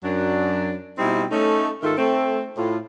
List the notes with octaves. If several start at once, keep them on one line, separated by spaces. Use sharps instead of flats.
F#2 F#3 D4
B2 G3 C4 D#4 E4
A3 C#4 D#4
G#2 D#3 A3 F4 A4 A#4
A3 C4
A2 F4